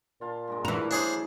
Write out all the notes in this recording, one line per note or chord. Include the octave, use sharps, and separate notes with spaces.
A#2 F4 F5 A5
G2 G#3 A#3
E3 F#3 A3 A#3 A#4
C#4 D4 G#4 C5